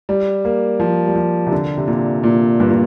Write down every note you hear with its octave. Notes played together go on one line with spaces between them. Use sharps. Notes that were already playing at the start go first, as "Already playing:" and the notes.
G3
A#3
F3
G3
F3
C3
D3
C3
A#2
A#2
G2
A#2